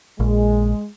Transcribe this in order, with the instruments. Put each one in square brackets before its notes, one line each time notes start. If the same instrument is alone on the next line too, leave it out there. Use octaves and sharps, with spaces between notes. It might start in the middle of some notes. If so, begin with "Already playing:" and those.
[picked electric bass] A#1 [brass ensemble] G#3